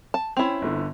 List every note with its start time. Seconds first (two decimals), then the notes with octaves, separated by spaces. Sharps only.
0.14 A5
0.37 C4 C#4 E4 F7
0.62 G1 D3